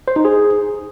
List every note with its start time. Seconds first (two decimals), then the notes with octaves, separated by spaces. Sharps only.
0.08 C5
0.16 D#4
0.25 G#4